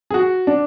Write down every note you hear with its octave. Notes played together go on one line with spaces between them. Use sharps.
G#4
F#4
D4